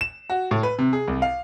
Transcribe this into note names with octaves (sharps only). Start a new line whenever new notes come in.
E7
F#4
A2
B4
C3
G#4
C2
F5